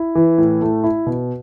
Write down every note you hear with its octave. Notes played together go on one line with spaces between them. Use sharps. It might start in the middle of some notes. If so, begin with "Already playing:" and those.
Already playing: E4
E3
A2
A3
E4
B2